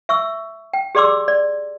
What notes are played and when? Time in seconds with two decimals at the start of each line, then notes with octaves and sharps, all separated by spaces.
0.09 E5 C#6 E6
0.73 G5
0.95 G4 G#4 D5 C6 D6 E6
1.28 D5